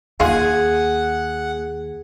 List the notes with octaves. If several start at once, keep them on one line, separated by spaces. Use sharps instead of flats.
D#2 D#4 F4 G#4 F#5